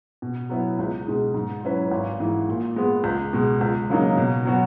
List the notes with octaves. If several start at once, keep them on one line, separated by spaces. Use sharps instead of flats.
B2
F#3 B3 E4
C#2
B2 G#3 D#4 G#4
G#2
F#3 C#4 E4 B4
G#1
G#2 E3
A#2
G#3 B3
C#2
B2 G#3
C#2
C#3 F#3 A#3 D#4
B2
F#3 B3 F#4